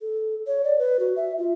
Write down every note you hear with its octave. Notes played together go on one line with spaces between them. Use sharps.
A4
C#5
D5
B4
F#4
E5
F4